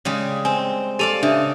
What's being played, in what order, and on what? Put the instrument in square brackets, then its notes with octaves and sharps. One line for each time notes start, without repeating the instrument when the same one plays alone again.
[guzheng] C#3 G3 G#3
[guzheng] C4 [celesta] G#5
[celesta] G4 D#7 F7 [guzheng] A4 D5 F5
[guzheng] C#3 [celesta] D4 E5